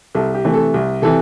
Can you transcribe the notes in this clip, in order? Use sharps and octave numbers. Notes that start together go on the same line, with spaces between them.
C2 A4
G4
C3 E3 A3
A4
C2
C3 E3 A4